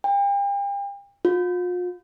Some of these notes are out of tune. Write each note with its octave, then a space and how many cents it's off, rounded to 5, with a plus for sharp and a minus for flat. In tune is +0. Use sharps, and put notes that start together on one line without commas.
G5 +40
F4 +40